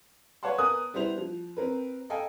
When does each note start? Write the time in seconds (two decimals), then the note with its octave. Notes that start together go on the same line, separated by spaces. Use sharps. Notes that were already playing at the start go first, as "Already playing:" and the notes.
0.43 B4 C#5 F5 F#5 A5 C6
0.58 B3 A#4 G#5 D#6 F#6
0.94 G3 B3 E4 C5 F7
1.18 F3
1.57 C4 A#4 B4
2.10 A4 D#5 F5 G5 G#5